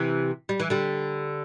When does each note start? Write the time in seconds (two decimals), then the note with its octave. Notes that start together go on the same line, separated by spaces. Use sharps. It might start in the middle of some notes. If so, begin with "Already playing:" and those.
Already playing: C3 E3
0.49 G3
0.60 E3
0.70 D3 G3